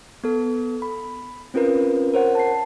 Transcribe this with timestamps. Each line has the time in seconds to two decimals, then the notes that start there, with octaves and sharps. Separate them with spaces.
0.24 B3 A4
0.82 B5
1.54 C4 C#4 F4 A#4 B4
2.14 A#4 C5 C#5 F#5
2.35 A5 C7